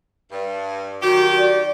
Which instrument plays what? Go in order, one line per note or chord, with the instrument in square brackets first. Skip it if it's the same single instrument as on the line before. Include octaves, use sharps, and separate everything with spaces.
[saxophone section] G2
[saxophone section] D#3 F#3 G4 [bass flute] F#4
[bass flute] D5